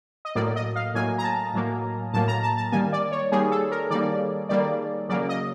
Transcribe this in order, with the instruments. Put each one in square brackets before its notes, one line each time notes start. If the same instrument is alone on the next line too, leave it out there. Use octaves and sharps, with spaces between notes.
[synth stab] D#5
A2 F#3 A#3 D5
D#5
F5
A2 F#3 A#3 G#5
A#5
A5
A2 F#3 A#3
A2 F#3 A#3 A5
A#5
A5
A5
D#3 G3 A#3 G#5
D5
C#5
D#3 G3 A#3 G#4
A4
A#4
D#3 G3 A#3 D5
D#3 G3 A#3 D5
C#3 F#3 A#3 D5
D#5